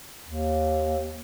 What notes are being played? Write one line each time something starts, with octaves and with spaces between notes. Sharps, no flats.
D#2